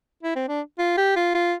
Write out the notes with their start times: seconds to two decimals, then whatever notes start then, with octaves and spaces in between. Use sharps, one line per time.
0.23 E4
0.36 C4
0.48 D4
0.79 F4
0.97 G4
1.16 F4
1.34 F4